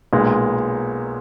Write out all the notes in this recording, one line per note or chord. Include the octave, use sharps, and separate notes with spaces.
B1 A#2 G#3